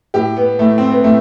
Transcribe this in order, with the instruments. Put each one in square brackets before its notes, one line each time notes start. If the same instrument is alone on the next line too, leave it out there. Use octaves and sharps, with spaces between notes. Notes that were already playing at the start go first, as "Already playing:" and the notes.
[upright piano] A2 G4
B3
A2 A3
C4
B3
A2 A3